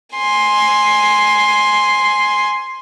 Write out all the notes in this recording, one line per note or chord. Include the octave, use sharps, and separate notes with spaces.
G#5 C6